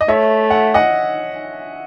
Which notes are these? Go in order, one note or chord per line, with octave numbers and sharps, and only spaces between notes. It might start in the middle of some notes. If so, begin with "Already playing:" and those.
D#5
A3 C#5 E5
F#5
D#5 F#5